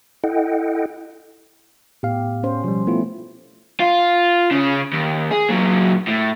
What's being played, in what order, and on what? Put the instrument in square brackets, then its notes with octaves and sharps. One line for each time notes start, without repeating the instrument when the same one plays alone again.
[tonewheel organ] E4 A4 D#5 F#5 G5
[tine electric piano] A2 B3 F5 [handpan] G4
[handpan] C#4 C5
[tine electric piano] B2 G3 [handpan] F3
[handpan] A3 [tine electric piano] B3 E4 F4
[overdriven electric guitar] F4
C#3 C#4
D#2
G#4
A#2 F#3
A2